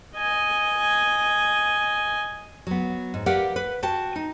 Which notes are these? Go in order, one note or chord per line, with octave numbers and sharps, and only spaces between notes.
D#5 G#5
F#3 B3
G#2
G4 A#4 B4 D5 F5 F#5
B4
F#4 G5 A5
D#4